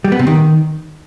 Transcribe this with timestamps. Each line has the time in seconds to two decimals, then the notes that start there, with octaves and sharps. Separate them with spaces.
0.04 G3
0.12 B3
0.19 C3
0.27 D#3